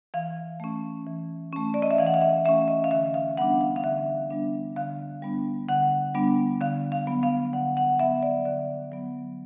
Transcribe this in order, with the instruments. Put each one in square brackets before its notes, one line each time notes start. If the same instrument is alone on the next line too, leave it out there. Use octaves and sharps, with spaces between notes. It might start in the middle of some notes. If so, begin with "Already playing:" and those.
[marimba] E3 F5
A3 C#4
E3
A3 C#4
D5
D#5
E5
E3 F5
F#5
F5
E5
A3 E5
C#4
D#5
F5
D3 E5
F5
G3 B3 D4 F#5
F5
F5
D3 E5
G3 B3 D4
D3 F5
G3 B3 D4
D3 F#5
G3 B3 D4
D3 F5
F5
F#3 B3
F5
D3 F#5
F#5
F#3 B3 E5
D5
D3 D5
F#3 B3